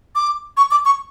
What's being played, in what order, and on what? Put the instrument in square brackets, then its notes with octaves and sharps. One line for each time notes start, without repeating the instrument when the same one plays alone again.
[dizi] D6
C#6
D6
C#6